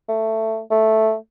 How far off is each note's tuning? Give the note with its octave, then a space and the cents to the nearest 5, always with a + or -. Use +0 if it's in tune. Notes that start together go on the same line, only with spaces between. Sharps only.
A3 +10
A3 -5